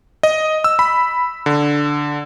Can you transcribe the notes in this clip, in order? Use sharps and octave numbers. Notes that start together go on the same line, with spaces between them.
D#5
E6
B5
D3